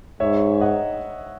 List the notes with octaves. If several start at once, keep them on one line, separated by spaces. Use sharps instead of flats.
G#2 C#5 E5
D#5 F#5